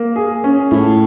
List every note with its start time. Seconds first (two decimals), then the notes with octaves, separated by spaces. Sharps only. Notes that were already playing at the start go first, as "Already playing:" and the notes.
Already playing: A#3
0.16 G#4
0.44 C#4
0.71 A2 E4